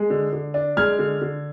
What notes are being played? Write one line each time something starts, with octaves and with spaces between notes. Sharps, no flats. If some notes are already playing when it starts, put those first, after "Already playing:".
Already playing: G#3
D3
D3
D4
G#3 F6 G#6
D3
D3